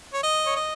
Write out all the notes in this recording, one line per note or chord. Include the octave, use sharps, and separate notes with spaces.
C#5
D#5
C#5
D#5